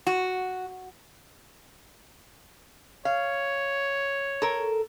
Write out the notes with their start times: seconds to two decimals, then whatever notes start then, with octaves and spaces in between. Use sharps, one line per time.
0.07 F#4
3.05 C#5 F5
4.42 A4 A#4